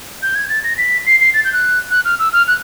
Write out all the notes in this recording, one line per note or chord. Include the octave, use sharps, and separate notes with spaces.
G6
G#6
A6
A#6
B6
C7
C7
A6
G6
F#6
F#6
F6
E6
F6
F#6